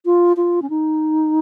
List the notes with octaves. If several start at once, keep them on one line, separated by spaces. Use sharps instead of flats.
F4
F4
C#4
D#4